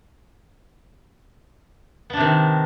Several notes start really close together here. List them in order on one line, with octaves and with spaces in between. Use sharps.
B3 D4 C3 D#3